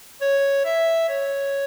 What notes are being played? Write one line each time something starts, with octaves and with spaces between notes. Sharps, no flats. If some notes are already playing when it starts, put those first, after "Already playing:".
C#5
E5
C#5